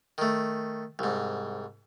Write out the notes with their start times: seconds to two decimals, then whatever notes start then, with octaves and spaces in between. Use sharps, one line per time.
0.18 D#3 A3
0.99 C2 G#2